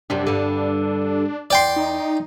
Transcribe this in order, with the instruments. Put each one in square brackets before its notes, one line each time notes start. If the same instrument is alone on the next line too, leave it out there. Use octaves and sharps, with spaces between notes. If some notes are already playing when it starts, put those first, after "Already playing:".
[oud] F#2 C3 G3 [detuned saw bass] D4
[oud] G2 D3
[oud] E2 [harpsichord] D5 G5 C6
[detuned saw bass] D#4